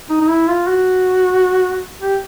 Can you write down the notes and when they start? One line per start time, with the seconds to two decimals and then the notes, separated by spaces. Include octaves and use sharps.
0.10 D#4
0.21 D#4
0.29 E4
0.48 F4
0.67 F#4
2.01 G4